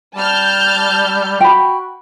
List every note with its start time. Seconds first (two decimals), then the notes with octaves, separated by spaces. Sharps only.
0.15 G3 A5 F6 G6
1.41 F#4 G5 B5